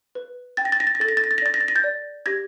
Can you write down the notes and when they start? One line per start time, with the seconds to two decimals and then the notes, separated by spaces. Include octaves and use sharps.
0.15 B4
0.57 G5 A6
0.65 A#6
0.72 A6
0.80 A#6
0.87 A6
0.95 A#6
1.00 A4 A6
1.09 A#6
1.17 A6
1.24 A#6
1.31 A6
1.38 A#6
1.42 D5 A6
1.54 A#6
1.60 A6
1.68 A#6
1.76 G6 A6
1.84 D5
2.26 G4 G#6 A#6